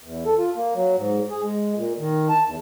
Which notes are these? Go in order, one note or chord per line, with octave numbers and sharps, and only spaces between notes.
E2
A4
F4
A#3
F#3
G#2
G#4
G#3
A#2
D#3
A5
E2